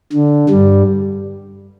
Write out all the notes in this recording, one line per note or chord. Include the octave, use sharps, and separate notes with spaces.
D3
G2 G3